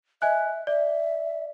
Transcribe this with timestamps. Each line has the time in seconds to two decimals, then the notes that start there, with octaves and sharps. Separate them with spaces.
0.22 D#5 E5 G#5 F#6
0.67 D5 E5